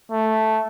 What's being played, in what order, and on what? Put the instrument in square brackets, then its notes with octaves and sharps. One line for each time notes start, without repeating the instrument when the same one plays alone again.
[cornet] A3